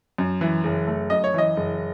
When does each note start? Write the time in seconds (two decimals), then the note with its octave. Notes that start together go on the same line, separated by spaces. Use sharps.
0.18 F#2
0.41 E3
0.64 F#1
0.87 A3
1.10 F#2 D#5
1.24 C#5
1.34 E3 D#5
1.57 F#1